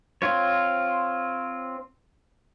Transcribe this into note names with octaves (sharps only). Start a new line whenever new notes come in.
C4 F4 C#5